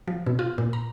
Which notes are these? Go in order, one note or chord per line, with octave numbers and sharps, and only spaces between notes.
F3
B2
F4
A#2
A#5